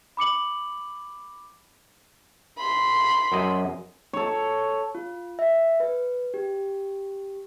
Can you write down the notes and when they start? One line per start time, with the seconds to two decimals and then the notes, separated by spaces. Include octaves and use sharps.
0.17 B5 D6 C#7 F#7
2.58 B5 C6
3.32 F#2 D#5
4.13 A4 C#5
4.95 F4
5.39 E5
5.80 B4
6.34 G4